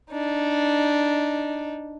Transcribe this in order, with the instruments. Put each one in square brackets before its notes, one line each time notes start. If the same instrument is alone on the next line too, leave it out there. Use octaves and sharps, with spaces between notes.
[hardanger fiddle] D4 D#4